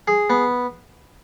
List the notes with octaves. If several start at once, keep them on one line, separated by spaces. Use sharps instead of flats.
G#4
B3